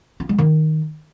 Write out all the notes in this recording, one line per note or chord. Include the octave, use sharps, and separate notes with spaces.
F4
G#3
D#3